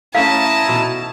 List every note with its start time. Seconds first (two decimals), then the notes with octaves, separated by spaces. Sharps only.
0.15 A3 C#4 E4 F5 A5 A#5 D#6
0.69 B2